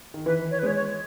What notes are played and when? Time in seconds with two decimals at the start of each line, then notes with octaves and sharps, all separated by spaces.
0.14 D#3
0.26 E3 B4
0.51 C#5
0.59 B4
0.63 G#3 C#5
0.75 C#5